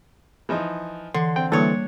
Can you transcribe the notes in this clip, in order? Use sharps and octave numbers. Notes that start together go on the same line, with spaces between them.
E3 F3 D#4
D3 E3 C6
C4 G5
D3 E3 G3 A#3 D4 A4 C#5